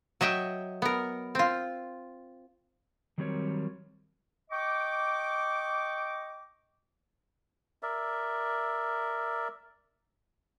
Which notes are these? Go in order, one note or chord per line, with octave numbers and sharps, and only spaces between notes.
F#3 D#5 E5 G5
B3 A#4
C4 F4
D#3 F#3 G3 C4 A#4 C#5
D#5 G5 C#6 D6
A#4 D5 E5